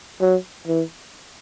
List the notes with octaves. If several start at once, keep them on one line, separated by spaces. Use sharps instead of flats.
F#3
E3